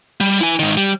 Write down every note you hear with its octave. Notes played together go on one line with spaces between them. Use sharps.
G3
E4 G#5
G#2 D#3
G3